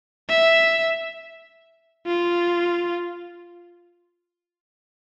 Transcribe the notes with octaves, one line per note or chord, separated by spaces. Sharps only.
E5
F4